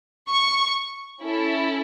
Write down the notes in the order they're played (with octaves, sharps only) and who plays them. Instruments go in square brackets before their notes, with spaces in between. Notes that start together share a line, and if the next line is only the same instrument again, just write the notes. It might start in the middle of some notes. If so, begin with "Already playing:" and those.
[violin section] C#6
C#4 E4 A4